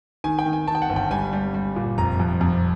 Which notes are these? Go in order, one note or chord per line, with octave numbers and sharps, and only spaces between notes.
D#3 G#5
G5
D#3
G#5
D#3 A5
G5
F#5
G1
G5
G3 G#5
G3
G3
A#2
F1 A#5
F2
F2